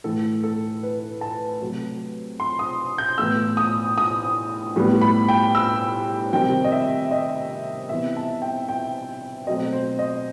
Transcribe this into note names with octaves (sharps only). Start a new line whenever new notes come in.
A2 E3 A3 A4
A4
B4
A5
C3 F#3 A3
C6
D#6
G6
A2 E3 B3 E6
D#6
D#6
A2 G3 B3
B5
G5
E6
C3 D#3 G3 C4 G5
D#5
E5
D#5
C3 E3 B3 E5
A5
G5
G5
B2 F#3 A3 C4 D#5
C5
D#5